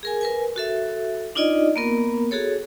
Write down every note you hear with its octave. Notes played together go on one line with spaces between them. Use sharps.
G#4 A#4 G#5
A#4 B4 G#5
F#4 A4 E5
D4 D#4 F4 D5 D#5
A#3 B3 A#4
F#4 G#4 A4 C#5